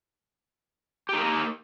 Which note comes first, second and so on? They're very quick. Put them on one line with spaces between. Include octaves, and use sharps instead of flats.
G4 D#4 A#3